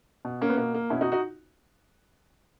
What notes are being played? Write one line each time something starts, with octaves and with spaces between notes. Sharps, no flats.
B2
A#3 C#4
B3
B2 A#3
A#3
B2 C#4 E4
D#4 F#4
D#4 F#4